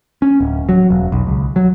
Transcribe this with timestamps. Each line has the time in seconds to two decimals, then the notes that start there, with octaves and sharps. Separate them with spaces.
0.22 C#4
0.40 D1
0.69 F#3
0.90 E1
1.12 B1
1.27 C#2
1.56 F#3